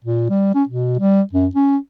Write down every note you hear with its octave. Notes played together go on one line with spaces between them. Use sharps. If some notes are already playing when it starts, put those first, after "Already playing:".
A#2
G3
C#4
B2
G3
F#2
C#4